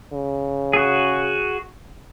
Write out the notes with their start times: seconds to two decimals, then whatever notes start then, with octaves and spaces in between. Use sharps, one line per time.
0.13 C#3
0.73 F#4 G#4